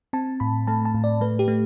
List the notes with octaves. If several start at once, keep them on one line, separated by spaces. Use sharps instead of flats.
C4 A5
A2 B5
A3 A5
A5
A2
D5
A3 B4
G4
A3